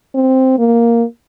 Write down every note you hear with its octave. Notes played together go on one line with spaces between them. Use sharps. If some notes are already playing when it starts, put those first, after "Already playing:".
C4
A#3